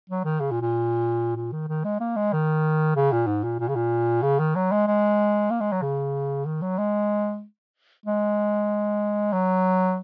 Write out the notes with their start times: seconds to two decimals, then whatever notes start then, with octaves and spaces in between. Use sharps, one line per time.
0.10 F#3
0.24 D#3
0.40 C#3
0.51 A#2
0.62 A#2
1.36 A#2
1.52 D#3
1.68 D#3
1.84 G#3
2.00 A#3
2.16 G#3
2.33 D#3
2.96 C#3
3.12 A#2
3.27 G#2
3.44 A#2
3.59 A#2
3.68 C#3
3.76 A#2
4.22 C#3
4.39 D#3
4.56 F#3
4.71 G#3
4.87 G#3
5.51 A#3
5.61 G#3
5.72 F#3
5.82 C#3
6.45 D#3
6.62 F#3
6.78 G#3
8.06 G#3
9.33 F#3